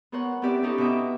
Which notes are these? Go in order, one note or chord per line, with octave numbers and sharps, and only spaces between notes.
B3 A#4 C5 C#5 F#5
B3 C4 E4 G4 D5 E5
B3 C#4 D#4 G4 A4
B2 D#5 E5 D6